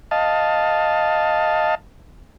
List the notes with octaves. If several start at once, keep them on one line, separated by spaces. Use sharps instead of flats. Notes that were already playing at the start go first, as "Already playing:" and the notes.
D#5 F5 A5